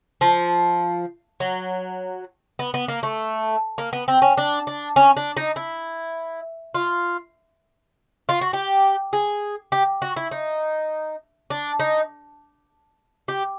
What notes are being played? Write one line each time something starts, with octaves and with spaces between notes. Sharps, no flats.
F3
F#3
B3
B3
A#3
A3
A#3
B3
C4
C#4
D4
D4
C#4
D4
D#4
E4
F4
F4
F#4
G4
G#4
G4
F#4
E4
D#4
D4
D#4
G4